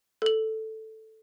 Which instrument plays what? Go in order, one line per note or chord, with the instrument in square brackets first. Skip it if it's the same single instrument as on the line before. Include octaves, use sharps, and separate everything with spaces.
[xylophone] A4 F#7